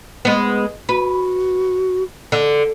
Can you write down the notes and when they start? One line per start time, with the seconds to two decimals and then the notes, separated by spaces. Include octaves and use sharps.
0.25 G#3 B3
0.89 F#4 B4
2.32 D3